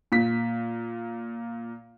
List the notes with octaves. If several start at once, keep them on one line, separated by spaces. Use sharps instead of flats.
A#2 B6